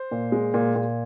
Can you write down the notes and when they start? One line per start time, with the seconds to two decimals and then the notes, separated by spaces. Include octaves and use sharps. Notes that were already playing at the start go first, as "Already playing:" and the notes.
Already playing: C5
0.11 A#2
0.32 G#3
0.54 A#2
0.75 A#2